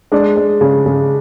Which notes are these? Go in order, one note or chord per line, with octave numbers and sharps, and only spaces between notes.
G#3 D4
G#3
C#3
C#3